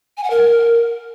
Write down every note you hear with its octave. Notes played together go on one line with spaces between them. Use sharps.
G#5
F#5
A#4